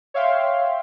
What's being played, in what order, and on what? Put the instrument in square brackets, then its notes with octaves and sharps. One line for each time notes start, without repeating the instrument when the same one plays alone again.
[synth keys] C#5 E5 F5 G5 C6